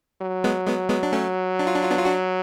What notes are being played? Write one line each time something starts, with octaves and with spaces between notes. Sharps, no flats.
F#3
G#3 B3
G#3 B3
G#3 B3
D4
A3 C#4
D4
F4
D4
F4
B3 D4
F4
D4 F#4